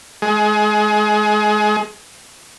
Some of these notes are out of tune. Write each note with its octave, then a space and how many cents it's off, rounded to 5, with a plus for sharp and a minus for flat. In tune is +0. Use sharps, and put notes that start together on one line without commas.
G#3 +25